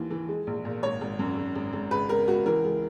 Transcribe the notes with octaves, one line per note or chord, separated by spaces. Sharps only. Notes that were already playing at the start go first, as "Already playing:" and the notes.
Already playing: D#2 E3
E3
G#3
A#1
A#2
G#1 C#5
G#1
F#2
G#1
G#1
G#1
C#2 B4
C#2 A#4
C#2 F#4
E3 A#4
C#2